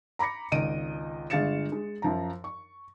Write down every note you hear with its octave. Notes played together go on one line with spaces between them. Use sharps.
A#5 B5 D6 A#6 C#7
G#1 C#2 D#5 D7 D#7
G1 G#3 F5 A6 C#7 E7
G#3
F#2 F3 A#5
C#6